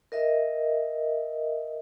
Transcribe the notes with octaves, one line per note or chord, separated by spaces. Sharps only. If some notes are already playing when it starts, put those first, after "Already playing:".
A#4 D#5 E5